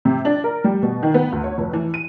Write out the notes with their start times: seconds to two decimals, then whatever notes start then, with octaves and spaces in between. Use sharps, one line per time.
0.05 C3
0.25 D4
0.44 A#4
0.64 G3
0.82 B2
1.03 D#3
1.14 B3
1.32 D2
1.44 C#5
1.58 F1
1.73 E3
1.94 D#7